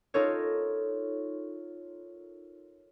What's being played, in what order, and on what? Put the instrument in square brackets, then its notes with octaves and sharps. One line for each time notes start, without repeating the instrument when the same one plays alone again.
[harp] D#4 F4 A4 A#4 C#5